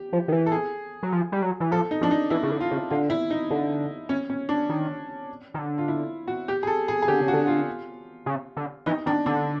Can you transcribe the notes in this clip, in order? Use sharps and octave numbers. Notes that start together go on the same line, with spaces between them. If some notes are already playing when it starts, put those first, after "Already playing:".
Already playing: G4
F3
D#3
E3
A4
G#4
F#3
F3
G3
F#3
E3
F3 A4
D#4
F3 D4
D#4
E3 E4
C#3
D3
F4
C#3
D3 F4
E4
D#4
D3
C#4
C#4
D4
D#3
D#3
D3
F4
E4
F#4
G4
G#4
A4
G#4
G#4
D3 G4
C#3
F#4
D3
F4
C#3
D3
E3 D#4
D#3 D4
D3 D4